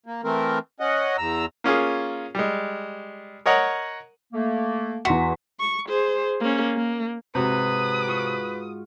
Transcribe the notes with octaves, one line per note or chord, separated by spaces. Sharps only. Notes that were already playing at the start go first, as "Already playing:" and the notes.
A#3
E3 A3 C4 A#4
C#4 D#5 F#5
E2 A#5 E6
A#3 C#4 F4 G#4
G3 G#3
A#4 C#5 D#5 F#5 A#5
A3 A#3
E2 F#4 C6 B6
C#6
G#4 C5
A#3 C#4
A#3
G#2 C3 F#4 B4 A#5 D#6
F4 C#6